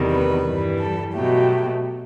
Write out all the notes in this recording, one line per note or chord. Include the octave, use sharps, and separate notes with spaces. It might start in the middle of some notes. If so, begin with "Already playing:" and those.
Already playing: E2 C3 D#3 G3
B4
G2 E3 G3
A4
B2 F#3 A3 G4